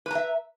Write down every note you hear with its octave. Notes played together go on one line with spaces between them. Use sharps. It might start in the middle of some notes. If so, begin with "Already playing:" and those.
B4 E5 A#5